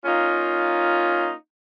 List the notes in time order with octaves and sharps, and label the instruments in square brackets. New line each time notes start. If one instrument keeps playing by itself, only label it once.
[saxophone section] A#3 C#4 D#4 F4